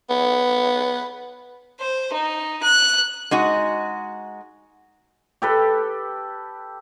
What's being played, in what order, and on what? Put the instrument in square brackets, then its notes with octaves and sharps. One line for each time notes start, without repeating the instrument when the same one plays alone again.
[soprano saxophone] B3
[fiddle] C5
D#4
F#6
[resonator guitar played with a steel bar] G#3 D#4 F#4
[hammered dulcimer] G4 A4 B4